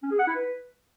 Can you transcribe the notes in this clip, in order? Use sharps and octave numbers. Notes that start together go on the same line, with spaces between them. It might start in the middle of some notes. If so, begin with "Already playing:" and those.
C#4
G#4
F#5
E4
B4